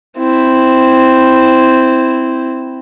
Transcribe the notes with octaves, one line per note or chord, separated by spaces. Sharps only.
C4 E4